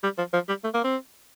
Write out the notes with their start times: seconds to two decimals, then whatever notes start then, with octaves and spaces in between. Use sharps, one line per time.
0.03 G3
0.18 F3
0.33 F3
0.48 G3
0.64 A3
0.74 A#3
0.84 C4